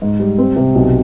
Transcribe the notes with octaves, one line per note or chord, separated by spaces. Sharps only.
G#2
G3
C4
C3
B1